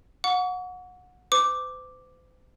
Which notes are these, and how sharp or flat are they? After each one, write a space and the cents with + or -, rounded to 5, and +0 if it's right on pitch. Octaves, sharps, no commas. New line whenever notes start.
F#5 -25 C#6 +40
C5 -45 D6 +0